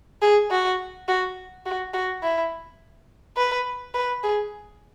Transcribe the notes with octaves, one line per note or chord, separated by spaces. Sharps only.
G#4
F#4
F#4
F#4
F#4
E4
B4
B4
G#4